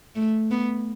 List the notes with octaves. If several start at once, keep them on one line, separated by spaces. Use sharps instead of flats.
A3
B3